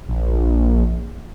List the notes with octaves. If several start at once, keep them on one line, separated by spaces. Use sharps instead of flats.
A#1